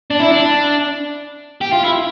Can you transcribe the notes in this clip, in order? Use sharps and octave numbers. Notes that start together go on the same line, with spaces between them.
D4
E4
D4
G4
F4
E4